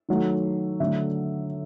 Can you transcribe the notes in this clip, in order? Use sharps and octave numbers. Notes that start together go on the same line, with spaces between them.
D#3 F#3 A3
D3 F#3 A3 E5